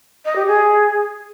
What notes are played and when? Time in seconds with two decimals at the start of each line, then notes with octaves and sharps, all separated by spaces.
0.25 D#5
0.36 G4
0.46 G#4